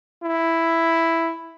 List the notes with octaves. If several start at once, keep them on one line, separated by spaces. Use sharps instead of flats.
E4